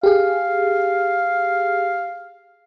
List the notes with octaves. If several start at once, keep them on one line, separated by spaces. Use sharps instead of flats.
G4 G#4 F5